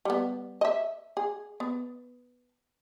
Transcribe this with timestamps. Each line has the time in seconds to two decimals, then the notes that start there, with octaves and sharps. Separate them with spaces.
0.05 G3 B3
0.61 D#5 E5
1.17 G#4
1.60 B3